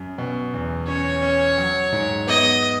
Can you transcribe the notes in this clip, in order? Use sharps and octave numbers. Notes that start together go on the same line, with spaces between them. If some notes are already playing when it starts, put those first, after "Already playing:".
Already playing: F#2
B2
E2
C#4 C#5
C#4
F#3
G#2
B3 D#5